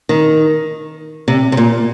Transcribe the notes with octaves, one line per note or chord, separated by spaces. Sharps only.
D#3
C3
C3
A#2